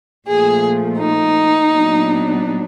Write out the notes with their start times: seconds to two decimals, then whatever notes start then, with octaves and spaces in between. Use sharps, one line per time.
0.27 A#2 F3 A3 G#4
1.00 D#4
1.70 A#2 F#3 B3 D4